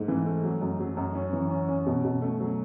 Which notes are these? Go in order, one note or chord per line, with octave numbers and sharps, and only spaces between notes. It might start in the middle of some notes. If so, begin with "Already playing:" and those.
Already playing: G#2 A3
E3
A3
F#3
F#2
F#3
F#2
C#4
E3
C#4
C#4
B2
B2
A3
F#3